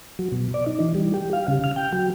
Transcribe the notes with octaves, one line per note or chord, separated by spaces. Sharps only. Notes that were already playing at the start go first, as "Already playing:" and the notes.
F#3
B2
D5
D#4
E3
G3
G4
F5
C#3
F6
G5
F#3